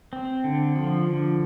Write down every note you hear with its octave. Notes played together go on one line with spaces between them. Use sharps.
C4
D3
F3
D3